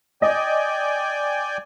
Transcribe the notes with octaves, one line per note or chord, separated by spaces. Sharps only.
D5 D#5 G5 G#5